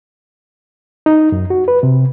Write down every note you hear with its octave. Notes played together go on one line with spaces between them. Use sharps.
D#4
F#2
F#4
B4
C3